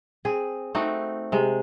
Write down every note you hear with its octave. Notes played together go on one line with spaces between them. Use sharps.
C4 G#4
A3 C4 D#4 F#4
C3 G#3